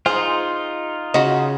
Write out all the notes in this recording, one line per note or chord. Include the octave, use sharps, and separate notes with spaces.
D#4 F4 G#4 C5
C#3 F#4 D#5